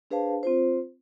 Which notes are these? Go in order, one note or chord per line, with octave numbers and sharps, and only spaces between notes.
D4 G#4 B4 C5 F5 A5
C4 F4 C5